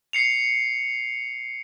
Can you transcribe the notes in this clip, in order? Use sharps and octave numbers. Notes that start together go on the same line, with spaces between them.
C7 C#7 F7